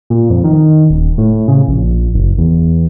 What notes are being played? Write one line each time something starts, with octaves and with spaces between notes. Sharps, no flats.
A#2
F2
D#3
D#1
A2
C#3
A#1
F#1
E2